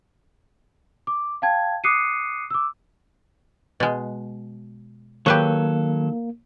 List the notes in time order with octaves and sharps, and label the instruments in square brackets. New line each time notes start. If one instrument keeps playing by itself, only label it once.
[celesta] D6
F5 G5 A5 G#6
D6 D#6 F#6 C7 C#7 D#7
D6 E6
[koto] B2 G#3
[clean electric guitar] D#3 F#3 A4 [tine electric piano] A#3 [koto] G4 B4 C#5